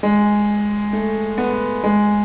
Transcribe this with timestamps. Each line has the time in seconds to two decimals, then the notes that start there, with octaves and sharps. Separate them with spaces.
0.03 G#3
0.93 A3
1.38 B3
1.84 G#3